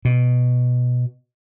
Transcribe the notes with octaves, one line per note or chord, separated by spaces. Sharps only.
B2